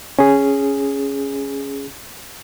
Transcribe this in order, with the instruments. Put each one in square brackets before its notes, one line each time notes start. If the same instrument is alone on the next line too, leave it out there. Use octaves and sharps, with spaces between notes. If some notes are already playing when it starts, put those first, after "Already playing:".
[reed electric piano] C#4 G#4